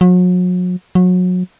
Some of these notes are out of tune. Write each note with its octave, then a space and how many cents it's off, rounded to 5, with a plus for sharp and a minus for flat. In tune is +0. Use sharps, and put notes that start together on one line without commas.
F#3 -40
F#3 -30